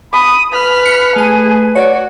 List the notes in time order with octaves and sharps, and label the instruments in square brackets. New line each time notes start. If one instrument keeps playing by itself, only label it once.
[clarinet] B5 [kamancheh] D#6
[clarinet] B4 [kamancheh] B5 F6
[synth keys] C#7
[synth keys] A3 D#7 [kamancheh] G#4
[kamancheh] F#4 [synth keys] C#5 D5